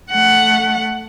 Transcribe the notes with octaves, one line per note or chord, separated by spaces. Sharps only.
A3 F#5